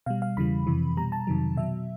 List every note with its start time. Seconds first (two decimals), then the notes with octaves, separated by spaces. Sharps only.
0.06 B2 G3 F5
0.22 F5
0.37 E2 C#3 E3 G3 B5
0.67 F2 C3 E3
0.97 B2 G3 A#5
1.12 A5
1.27 F2 C3 D#3 F#3
1.57 B2 F#3 E5